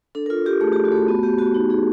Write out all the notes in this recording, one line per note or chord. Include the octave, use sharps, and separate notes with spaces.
D4 A4
A#4
F4 A4
F4 G4
A3 G#4
F4 G4
F#4
A3 G4
B3 F#4
B3 G4
B3 F#4
D#4
D#4 G#4